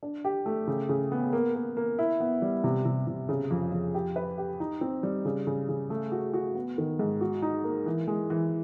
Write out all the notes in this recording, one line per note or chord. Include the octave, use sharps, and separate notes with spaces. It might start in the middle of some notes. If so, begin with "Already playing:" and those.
D4
G4
A3
C#3
C#3
B3
A#3
A#3
A#3
E4
B3
G3
C3
C3
C3
C#3
F2
F2
G4
B4
G4
D#4
C4
G3
C#3
C#3
C#3
A3
F#4
F#4
B3
D#3
G#2
F#4
D#4
A#3
E3
G#3
E3